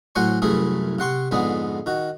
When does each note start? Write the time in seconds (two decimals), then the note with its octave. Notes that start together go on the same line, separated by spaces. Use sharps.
0.15 A2 F#3 C5 F#5 G#5 C#6
0.42 C2 F#2 E3 A3 E4 G#4
0.99 C3 F#5 C6 C#6
1.31 F2 G#2 D3 B3 G#4
1.86 D#3 F#4